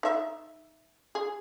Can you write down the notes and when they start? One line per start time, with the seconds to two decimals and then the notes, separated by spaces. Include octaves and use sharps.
0.03 D#4 E5
1.15 G#4